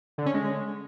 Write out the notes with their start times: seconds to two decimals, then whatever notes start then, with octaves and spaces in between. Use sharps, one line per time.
0.18 D3
0.26 C#4
0.34 G#3